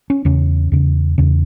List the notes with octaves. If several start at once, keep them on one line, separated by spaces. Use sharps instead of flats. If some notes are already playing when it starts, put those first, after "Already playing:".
C#4
E2 C#3 C#4
E2 C#3
E2 C#3